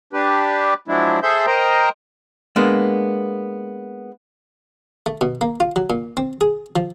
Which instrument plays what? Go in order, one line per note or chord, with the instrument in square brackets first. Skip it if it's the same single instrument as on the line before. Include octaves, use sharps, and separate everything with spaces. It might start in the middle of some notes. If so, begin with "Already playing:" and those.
[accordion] D4 G4 B4
F3 F#3 G#3 D4 E4
G#4 A4 C5 E5 C6 G6
A#4 C5 D#5 G5 A#5
[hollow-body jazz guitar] G#3 A#3 B3 D4
[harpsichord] A3
B2
A#3
F4
F#3
A#2
C4
G#4
F3